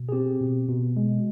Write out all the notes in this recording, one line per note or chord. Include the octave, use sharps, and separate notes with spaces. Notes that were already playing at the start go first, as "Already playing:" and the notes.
Already playing: B2
G#4
C4 G4
B2
B2
G#3